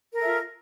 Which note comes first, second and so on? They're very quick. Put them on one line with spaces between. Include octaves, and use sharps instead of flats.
A#4 A4 E5 F4